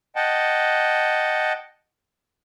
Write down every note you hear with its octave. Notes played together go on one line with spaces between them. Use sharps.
D#5 F#5 G5 A5